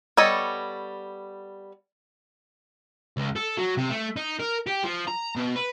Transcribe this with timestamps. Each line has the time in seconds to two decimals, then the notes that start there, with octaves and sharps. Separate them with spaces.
0.17 G3 B3 A4 C#5 D#5
3.17 C#2
3.36 A4
3.58 F#3
3.77 C3
3.90 A3
4.16 D#4
4.39 A#4
4.67 G4
4.84 F3
5.08 A#5
5.36 B2
5.56 B4